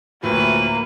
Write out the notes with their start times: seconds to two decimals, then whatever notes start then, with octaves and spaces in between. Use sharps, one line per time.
0.23 D2 A2 F3 A#3 B4